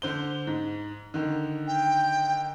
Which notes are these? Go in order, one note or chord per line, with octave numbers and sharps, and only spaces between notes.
D3 C5 G7
G#2
D3 D#3
G5